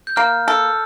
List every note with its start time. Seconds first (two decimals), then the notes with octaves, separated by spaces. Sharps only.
0.07 G6
0.16 A#3 F6
0.48 A4